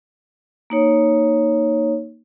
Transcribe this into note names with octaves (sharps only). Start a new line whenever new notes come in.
A#3 D#4 C#5